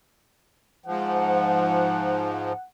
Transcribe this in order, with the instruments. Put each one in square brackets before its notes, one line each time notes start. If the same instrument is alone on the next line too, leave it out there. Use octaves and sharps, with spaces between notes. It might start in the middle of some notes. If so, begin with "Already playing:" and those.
[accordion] G#2 F3 [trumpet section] F#5